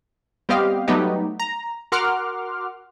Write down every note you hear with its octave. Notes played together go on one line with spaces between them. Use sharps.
G3 B3 C4 G4 D#5 F5
F#3 G3 A3 B3 D#4 G4
A#5
F#4 A#4 F#5 C6 D6 F6